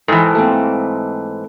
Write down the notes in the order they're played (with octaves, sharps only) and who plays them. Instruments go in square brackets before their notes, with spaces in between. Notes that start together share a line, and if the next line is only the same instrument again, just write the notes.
[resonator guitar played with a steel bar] G#2 E3 [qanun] A4 A#4 G5
[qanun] A3 A#3 C4